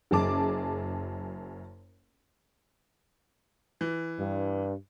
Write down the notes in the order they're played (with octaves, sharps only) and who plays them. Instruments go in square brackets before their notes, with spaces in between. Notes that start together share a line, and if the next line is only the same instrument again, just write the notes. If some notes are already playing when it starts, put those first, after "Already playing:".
[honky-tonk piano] F#1 F#2 G#4 A5 D6
[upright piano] E3
[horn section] G2